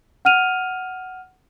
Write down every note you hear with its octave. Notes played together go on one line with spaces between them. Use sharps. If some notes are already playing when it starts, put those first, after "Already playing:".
F#5 F6 D#7 F7